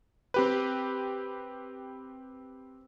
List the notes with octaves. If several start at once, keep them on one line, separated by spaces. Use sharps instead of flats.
C4 G4 B4